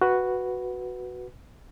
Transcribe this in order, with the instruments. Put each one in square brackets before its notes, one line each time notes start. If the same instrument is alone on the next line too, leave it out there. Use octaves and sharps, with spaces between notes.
[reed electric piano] F#4 B4